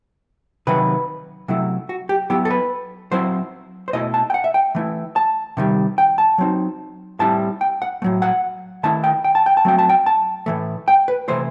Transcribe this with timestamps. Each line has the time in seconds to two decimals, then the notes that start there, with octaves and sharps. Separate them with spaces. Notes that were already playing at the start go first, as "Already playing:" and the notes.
0.67 C3 D#3 F#3 B4
1.48 C3 F#3 A3 E4
1.89 F#4
2.09 G4
2.30 F#3 B3 E4 G4
2.45 A4
2.51 B4
3.12 F#3 C4 E4 C5
3.88 C5
3.93 B2 A3 E4 D#5
4.14 A5
4.30 G5
4.34 F#5
4.44 E5
4.54 G5
4.75 E3 A3 E4
5.16 A5
5.57 C3 D#3 G3
5.98 G5
6.18 A5
6.38 F#3 C4 D#4
7.19 A2 G3 C4 E4 A5
7.61 G5
7.82 F#5
8.02 A3
8.04 A2 F#3
8.22 F#5
8.83 D#3 A3 E4 A5
9.04 G5
9.24 G5
9.35 A5
9.46 G5
9.57 A5
9.65 F#3 A3 C4 G5
9.79 A5
9.90 G5
10.06 A5
10.46 A2 E3 A3
10.88 G5
11.08 B4
11.28 C3 E3 A3 C5